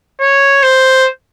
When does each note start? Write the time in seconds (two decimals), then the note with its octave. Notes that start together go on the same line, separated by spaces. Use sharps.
0.20 C#5
0.63 C5